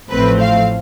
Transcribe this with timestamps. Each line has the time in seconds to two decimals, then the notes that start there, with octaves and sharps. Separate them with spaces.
0.10 A1 A2 F3 A3 C4 B4
0.41 F5